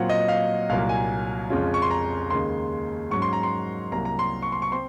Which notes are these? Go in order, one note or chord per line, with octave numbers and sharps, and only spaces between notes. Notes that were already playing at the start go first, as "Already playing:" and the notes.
Already playing: A#2 F#3 C4 F4 F#5
D#5
F5
C2 A#2 F#3 A#3 F5
G#5
F2 C#3 G#3 C#4 F4
C#6
C6
A#5
D#2 C#3 G#3 D#4 C6
G#2 F#3 C#4 C#6
C6
A#5
C6
C2 C3 F#3 A#3 A#5
A#5
C6
C#6
C6
C#6
C4 C6